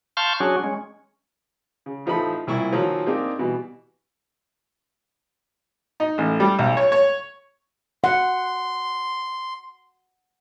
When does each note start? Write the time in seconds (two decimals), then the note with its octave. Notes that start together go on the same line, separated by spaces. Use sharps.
0.17 F5 A5 C6 C#6 F6 G6
0.40 F#3 C#4 D4 F#4 G#4
0.64 G#3 C#4
1.86 C#3
2.06 A1 F3 D#4 A4 B5
2.47 C2 A#2 E4 C#6
2.72 A#2 D#3 F3 F#3
3.06 A#3 C4 D4 D#4 G4 G#4
3.39 B2 E3 G3
6.00 D#4
6.18 A1
6.40 G3
6.59 B1
6.77 C#5
6.92 C#5
8.04 F#5 C6